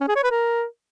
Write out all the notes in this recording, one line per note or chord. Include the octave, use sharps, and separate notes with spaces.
C#4
G#4
C#5
B4
A#4